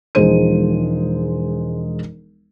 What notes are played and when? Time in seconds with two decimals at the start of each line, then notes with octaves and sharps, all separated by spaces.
0.15 E1 F3 G#3 D#4 C5 D#7